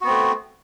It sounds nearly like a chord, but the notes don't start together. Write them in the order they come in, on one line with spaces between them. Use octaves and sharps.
F#4 B3 C4 A3